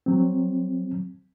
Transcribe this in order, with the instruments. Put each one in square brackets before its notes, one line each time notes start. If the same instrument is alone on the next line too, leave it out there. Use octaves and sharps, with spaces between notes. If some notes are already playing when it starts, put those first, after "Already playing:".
[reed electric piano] F#3 C4